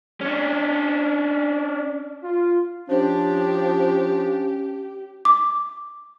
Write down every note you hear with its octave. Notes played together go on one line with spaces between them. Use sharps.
C#4 D4
F4
F3 C#4 D4 G4
D6